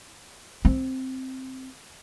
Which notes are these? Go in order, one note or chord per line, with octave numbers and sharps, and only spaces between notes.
C4